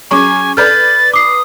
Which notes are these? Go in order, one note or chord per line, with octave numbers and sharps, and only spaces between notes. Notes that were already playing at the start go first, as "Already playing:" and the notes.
F#3 C#4 G#4 G#5 C#6 D6
A4 B4 D5 F6 G6 A6
D6 D#6 C7